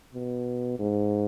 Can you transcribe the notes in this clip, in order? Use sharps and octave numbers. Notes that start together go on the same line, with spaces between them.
B2
G#2